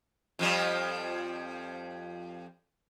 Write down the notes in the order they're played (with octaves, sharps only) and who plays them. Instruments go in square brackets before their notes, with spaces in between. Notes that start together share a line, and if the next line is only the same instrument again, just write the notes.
[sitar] F2 F3 G3